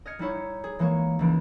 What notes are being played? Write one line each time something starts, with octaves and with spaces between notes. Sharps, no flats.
D#5 F6 G#6 C#7
G3 D#4 E4 C#5
G#4
E3 G#3 A#3 C#5
C#2 E3 D7